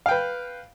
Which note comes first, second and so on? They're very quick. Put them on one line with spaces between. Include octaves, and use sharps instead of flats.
F5 G5 B4